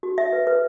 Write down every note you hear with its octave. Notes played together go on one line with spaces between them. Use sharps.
F#4
E5
B4
B4